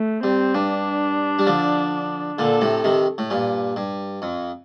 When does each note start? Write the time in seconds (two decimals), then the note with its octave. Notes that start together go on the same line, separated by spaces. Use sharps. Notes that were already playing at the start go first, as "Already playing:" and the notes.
Already playing: A3
0.23 G2 C4
0.54 G2 D4
1.39 G3
1.47 D3 F3
2.38 A#2 D3 A4
2.61 A2 C3
2.84 C3 D#3
3.18 A2
3.30 G2 A#2
3.76 G2
4.22 F2